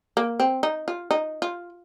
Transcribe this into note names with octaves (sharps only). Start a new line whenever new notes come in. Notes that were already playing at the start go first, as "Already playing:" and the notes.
A#3
C4
D#4
F4
D#4
F4